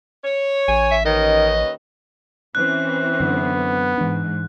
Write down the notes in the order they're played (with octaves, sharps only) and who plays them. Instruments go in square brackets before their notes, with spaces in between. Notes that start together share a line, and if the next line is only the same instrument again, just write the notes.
[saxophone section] C#5
[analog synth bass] A1 [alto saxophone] G#5
[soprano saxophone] E5
[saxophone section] D#2 C#4 B4 [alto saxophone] D#3 [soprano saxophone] D#5
[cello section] E3 C4 C#4 [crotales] F#6
[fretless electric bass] F#2 D3 [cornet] B3
[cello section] G#2 [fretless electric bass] E3 D4